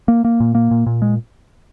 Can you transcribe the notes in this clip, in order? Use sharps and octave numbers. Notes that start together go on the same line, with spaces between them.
A#3
A#3
A#2
A#3
A#2
A#2
G#3